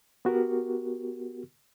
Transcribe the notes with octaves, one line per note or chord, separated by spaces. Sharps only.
B3 F#4 G4 A#4